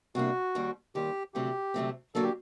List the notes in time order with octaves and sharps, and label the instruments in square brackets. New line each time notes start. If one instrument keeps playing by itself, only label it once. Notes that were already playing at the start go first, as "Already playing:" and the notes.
[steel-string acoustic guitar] C3 G3 A#3 D4 [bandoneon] F#4
[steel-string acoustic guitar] D#2 D#3 G3
[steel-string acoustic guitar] D#2 D#3 G3 [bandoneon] G4
[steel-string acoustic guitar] D2 C3 F#3 A3 C4 [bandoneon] G4
[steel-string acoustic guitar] D2 C3 F#3 A3 C4
[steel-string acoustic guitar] D3 F#3 A#3 D4 [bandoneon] A4
[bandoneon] G4